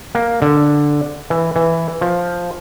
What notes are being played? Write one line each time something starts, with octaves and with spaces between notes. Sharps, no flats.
A#3
D3
E3
E3
F3